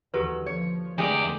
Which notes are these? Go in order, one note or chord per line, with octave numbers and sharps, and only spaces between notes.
D#2 D3 E3 F#3 G4 A4 B4
F3 C#5
E2 D3 G#3 A3 G4 D5 G#5